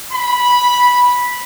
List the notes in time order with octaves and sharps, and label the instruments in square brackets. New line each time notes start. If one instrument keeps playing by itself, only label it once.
[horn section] B5